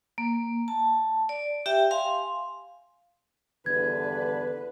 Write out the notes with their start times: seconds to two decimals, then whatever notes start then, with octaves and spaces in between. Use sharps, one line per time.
0.18 A#3
0.68 A5
1.29 D5
1.66 G4 E5 G5
1.91 F5 G#5 C6
3.66 E2 G2 D3 B4 G#6